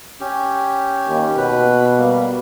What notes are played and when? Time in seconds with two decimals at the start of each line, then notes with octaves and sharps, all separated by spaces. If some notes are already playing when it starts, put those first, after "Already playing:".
0.20 C#4 G4
1.08 D#2
1.37 B2 B4
1.98 G3 A#3